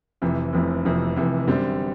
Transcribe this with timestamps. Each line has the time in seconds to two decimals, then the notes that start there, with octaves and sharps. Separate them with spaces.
0.22 F1 F2 C3 E3
0.53 F1 F2 C3 E3
0.85 F1 F2 C3 E3
1.16 F1 F2 C3 E3
1.47 F#2 D3 G3 C4